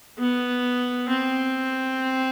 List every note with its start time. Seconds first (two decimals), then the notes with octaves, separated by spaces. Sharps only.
0.19 B3
1.09 C4